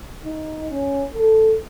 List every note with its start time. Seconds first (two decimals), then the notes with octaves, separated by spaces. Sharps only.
0.24 D#4
0.70 C#4
1.14 A4